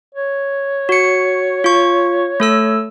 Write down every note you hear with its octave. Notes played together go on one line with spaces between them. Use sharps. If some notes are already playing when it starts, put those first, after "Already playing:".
C#5
F#4 C#7
F4 C#6
A3 A4 E6